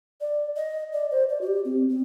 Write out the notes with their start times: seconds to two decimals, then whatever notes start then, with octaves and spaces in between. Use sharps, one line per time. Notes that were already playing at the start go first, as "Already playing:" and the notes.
0.21 D5
0.56 D#5
0.93 D5
1.11 C5
1.29 D5
1.41 F#4
1.47 G4
1.65 C4
1.89 C4